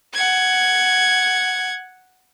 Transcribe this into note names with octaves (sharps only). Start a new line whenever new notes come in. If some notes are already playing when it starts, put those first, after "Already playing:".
F#5 G#6